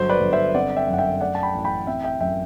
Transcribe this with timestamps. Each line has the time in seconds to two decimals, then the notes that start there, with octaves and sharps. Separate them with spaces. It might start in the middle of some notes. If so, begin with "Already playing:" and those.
Already playing: G1 F#3 C5
0.09 B4 D5
0.21 G1
0.33 C5 E5
0.54 C4 D5 F#5
0.76 E5 G5
0.88 F#2
0.93 F#5
0.99 E5 G5
1.21 A3 D5 F#5
1.35 A5
1.43 G5 B5
1.54 A1
1.65 G5 B5
1.87 C4 E5 G5
2.04 E5 G5
2.20 F#2 E5 G5